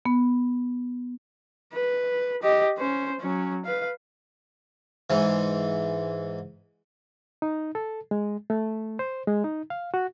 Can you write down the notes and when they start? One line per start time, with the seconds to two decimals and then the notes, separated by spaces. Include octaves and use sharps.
0.05 B3
1.73 B4
2.43 G4 D#5
2.78 C#4 C5
3.20 F#3 C#4
3.65 B4 F5
5.10 G#2 E3
7.42 D#4
7.75 A4
8.11 G#3
8.50 A3
8.99 C5
9.28 G#3
9.44 D#4
9.70 F5
9.94 F#4